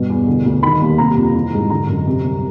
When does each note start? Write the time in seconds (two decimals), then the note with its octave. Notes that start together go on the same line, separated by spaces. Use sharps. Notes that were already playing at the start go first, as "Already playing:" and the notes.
Already playing: G2 B2
0.10 E2
0.27 D3
0.45 D2
0.63 D#3 B5
0.81 D#2
0.98 C3 A#5
1.17 F2
1.34 E3
1.53 G#2
1.70 D3 A#5
1.89 F#2
2.07 C3
2.24 C2